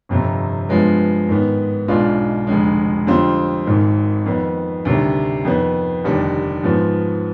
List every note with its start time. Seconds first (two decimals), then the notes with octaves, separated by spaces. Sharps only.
0.09 G1 F2 C3
0.69 G2 F3 G#3 B3
1.29 G#2 D#3 B3
1.88 B1 B2 G#3 D4 F4
2.47 F1 F2 D3 G#3
3.07 F2 D3 G3 C4 F4
3.67 G#1 G#2 D#3
4.26 F2 D#3 B3
4.85 D2 C3 D#3 G3
5.45 F2 D#3 B3
6.04 F1 D#2 D3 G3
6.63 G#2 F3 B3